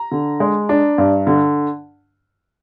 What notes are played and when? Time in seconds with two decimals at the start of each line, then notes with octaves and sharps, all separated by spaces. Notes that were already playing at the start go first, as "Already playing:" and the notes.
Already playing: A#5
0.12 D3
0.40 G#3
0.69 D4
0.98 G2
1.27 D3